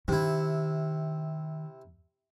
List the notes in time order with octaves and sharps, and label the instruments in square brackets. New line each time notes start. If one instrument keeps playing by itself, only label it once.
[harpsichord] C3 E4 [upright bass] D#3 D#4